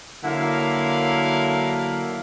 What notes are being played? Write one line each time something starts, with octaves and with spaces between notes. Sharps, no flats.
D3 F#3 A#3 E4 A#4 F5